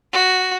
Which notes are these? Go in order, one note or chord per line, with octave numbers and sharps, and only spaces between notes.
F#4